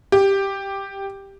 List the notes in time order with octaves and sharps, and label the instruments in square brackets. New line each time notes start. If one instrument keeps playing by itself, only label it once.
[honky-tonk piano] G4